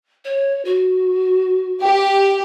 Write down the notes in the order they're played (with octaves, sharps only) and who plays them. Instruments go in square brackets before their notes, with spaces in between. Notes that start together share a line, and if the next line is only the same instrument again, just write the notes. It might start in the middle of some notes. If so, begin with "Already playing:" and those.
[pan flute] C#5
F#4
[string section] G4